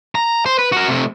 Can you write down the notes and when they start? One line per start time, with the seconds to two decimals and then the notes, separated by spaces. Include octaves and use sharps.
0.15 A#5
0.46 C5
0.59 B4
0.72 F#4 A#4
0.88 C3 A3